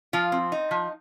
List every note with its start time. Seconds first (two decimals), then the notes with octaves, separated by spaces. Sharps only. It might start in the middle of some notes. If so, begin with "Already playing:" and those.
0.13 F3 F4
0.32 C4
0.52 D#4
0.71 F3